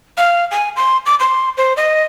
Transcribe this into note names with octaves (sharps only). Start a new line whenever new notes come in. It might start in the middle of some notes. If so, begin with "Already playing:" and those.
F5
G#5
C6
D6
C6
C5
D#5